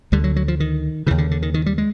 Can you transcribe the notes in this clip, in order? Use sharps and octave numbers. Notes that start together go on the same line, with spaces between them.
D2 D3 G3
F#3
F#3
F3
D#3
D#2 C#3 E3
D3
D3
D#3
D#3
G3
G#3